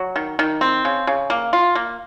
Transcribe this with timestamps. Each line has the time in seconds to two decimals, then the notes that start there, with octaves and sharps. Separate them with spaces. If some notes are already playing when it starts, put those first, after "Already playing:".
Already playing: F#3
0.16 D#3
0.39 D#3
0.61 C4
0.85 C#3
1.07 C#3
1.30 A#3
1.53 F4
1.75 A#3